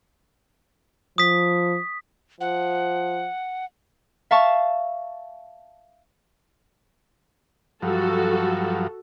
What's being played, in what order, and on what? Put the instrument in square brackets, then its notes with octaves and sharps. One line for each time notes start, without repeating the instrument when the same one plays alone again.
[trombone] F3 [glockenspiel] D#6 B6
[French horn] F3 [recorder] F#5
[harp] E5 F5 A5 C#6
[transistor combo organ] G2 F3 F#3 [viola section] F#4 A4